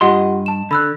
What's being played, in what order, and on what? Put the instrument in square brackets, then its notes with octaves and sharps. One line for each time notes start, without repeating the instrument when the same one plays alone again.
[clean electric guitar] G2 D#5 C6 [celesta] F4 G4 F#5
[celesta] A5 E7
[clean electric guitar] D3 [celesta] B5 E6 F#6